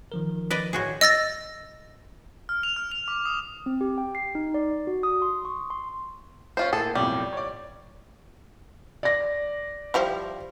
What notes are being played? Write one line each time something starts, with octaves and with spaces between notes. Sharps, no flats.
D#3 F3 A#4
B4 D5 D#5
A2 F#4 G#4
D#5 E6 A6 A#6
F6
F7
F6
F7
D6
D#6
C4
G4
G5
C7
D#4
D5
F#4
D#6
C6
C#6
C6
C#4 F4 C5
A2 A#3 G#4 A4
B1 F2 A2 G3
C#5 D5
D5 A#6
F3 G3 E4